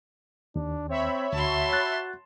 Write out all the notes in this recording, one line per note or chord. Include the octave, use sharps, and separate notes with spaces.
D#2 D4
C4 C#5 E5 B5
D2 F#4 A5 C6
F#6 A6